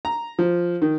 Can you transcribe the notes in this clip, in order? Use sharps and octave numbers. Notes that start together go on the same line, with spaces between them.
A#5
F3
D#3